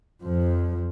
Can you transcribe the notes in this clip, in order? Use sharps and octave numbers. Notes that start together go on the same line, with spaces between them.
F2 F3